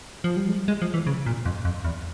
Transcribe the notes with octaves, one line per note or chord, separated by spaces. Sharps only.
F3
G3
G#3
G#3
F3
E3
C#3
A#2
F2
F2
E2